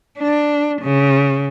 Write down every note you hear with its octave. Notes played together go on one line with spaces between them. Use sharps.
D4
C#3